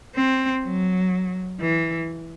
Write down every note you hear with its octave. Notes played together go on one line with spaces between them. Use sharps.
C4
F#3
E3